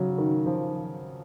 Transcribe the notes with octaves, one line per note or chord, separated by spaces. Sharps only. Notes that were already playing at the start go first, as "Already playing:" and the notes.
Already playing: C#3 F#3
D#3
F3